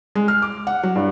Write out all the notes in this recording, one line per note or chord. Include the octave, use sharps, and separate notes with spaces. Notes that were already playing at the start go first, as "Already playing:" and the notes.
G#3
F6
D6
F#5
F#3
G2